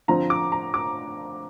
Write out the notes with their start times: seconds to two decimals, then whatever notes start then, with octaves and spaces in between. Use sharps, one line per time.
0.08 D3 F3 C4 F4 A#5
0.30 D6
0.52 A#5
0.74 D6